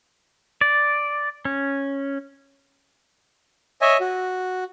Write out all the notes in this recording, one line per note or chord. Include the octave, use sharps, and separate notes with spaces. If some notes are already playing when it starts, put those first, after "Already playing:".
D5
C#4
C#5 D#5 E5 G#5
F#4